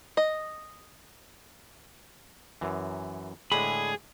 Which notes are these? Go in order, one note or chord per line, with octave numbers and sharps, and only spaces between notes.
D#5
F#2 E3
A2 D3 G#3 G#4 B5